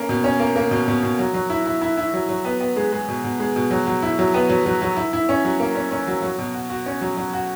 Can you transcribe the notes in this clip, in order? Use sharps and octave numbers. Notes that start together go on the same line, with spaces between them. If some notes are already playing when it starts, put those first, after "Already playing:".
Already playing: A#3 C#4
B2
C#4
A#3
A#3
B2
B2
B2
F#3
F#3
E4
E4
E4
E4
F#3
F#3
B3
B3
G#3
G#3
B2
B2
G#3
B2
F#3
F#3
E4
F#3
B3
F#3
F#3
F#3
E4
E4
C#4
F#3
A#3
C#4
C#4
F#3
F#3
B2
F#4
F#4
C#4
F#3
F#3
F#4